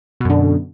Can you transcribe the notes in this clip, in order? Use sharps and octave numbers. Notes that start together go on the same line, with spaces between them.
F#2 B2 D3